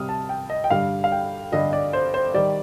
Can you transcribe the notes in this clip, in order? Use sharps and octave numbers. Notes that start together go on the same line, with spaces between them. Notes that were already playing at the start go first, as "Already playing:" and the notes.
Already playing: C3 G3 D#6 F6
A5
G5
D#5
G5
G2 D3 G3 F5
F5
G5
G2 D3 G3 D#5
D5
C5
C5
D#3 G3 D5